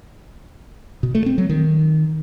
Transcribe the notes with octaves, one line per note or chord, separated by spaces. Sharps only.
B2
A3
C4
F#3
D#3